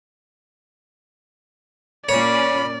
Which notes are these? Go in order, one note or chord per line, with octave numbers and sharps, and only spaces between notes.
A#2 A#3 C#4 C#5 D5 B5